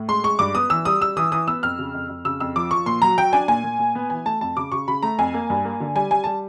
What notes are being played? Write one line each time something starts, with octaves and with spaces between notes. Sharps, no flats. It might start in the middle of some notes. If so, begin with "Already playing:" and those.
Already playing: A2
G#3 C6
G#3 C#6
G2 D6
B3 D#6
E3 E6
G3 D#6
G3 E6
E3 D#6
E3 D#6
B3 E6
F2 F6
C#3
F2
F2
C#3 E6
F2 E6
F3 D6
F3 C#6
A#2 C6
F#3 A#5
F#3 G5
D4 G#5
A#2 G#5
A#2
A#2
B3
E3 G#5
A3 A5
F2 A5
C#3 D6
C#3 C#6
C#3 B5
A3 A#5
F2 G#5
A#3
G2
A#3
D3
G3 G#5
G3 G#5
G3 A5